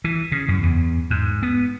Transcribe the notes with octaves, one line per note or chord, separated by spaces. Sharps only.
E3
C#3
F#2
E2
G#2
B3